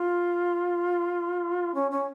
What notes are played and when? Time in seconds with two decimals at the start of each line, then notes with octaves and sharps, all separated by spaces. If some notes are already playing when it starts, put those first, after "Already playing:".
Already playing: F4
1.75 C#4
1.91 C#4